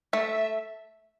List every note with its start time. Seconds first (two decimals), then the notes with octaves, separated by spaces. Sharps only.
0.13 A3 E5